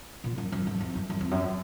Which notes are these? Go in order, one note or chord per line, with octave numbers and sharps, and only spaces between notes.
A#2
F#2
F#2
G#2
F2
F#2
F#2
F2
F#2